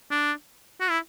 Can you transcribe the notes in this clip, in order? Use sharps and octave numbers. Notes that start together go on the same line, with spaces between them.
D4
F#4
E4